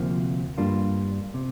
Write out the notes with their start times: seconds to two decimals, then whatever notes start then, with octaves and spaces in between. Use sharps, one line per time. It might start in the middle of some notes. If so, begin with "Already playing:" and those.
Already playing: D2 C3 F3 A#3
0.58 G2 G3 A#3 D4 F4
1.34 C3